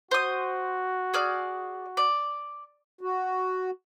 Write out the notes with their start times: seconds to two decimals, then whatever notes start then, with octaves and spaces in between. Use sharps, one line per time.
0.11 F#4 C5 D#6
1.14 G#4 D5 F6
1.97 D5
3.01 F#4